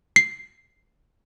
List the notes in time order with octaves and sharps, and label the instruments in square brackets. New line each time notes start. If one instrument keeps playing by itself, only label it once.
[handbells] C7